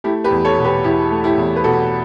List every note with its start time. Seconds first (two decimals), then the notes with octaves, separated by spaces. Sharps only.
0.04 A3 E4 G4
0.24 G4 B4
0.31 E2
0.44 A4 C#5
0.57 B2
0.64 G4 B4
0.84 E2 E4 G4
1.11 A3
1.24 E4 G4
1.37 E2
1.56 B4
1.64 B2 F#4 A4